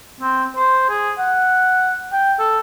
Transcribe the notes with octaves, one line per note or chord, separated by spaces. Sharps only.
C4
C5
G#4
F#5
G5
A4